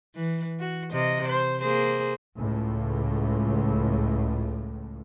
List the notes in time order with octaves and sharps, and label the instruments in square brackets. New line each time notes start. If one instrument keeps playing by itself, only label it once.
[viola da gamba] E3
F#4
C3 D#5
C5
A#3 G#4 C5
[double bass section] C#2 A2